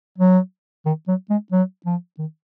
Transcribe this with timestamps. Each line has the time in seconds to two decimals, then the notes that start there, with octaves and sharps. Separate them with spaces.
0.18 F#3
0.85 D#3
1.08 F#3
1.30 G#3
1.52 F#3
1.86 F3
2.19 D#3